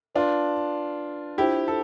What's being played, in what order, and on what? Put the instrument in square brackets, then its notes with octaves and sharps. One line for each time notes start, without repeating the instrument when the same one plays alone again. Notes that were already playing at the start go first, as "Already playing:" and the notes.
[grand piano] D4 F4 [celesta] B4 D5 A5 C6
[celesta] D4 F4 C5 [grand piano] E4 G4
[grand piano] A4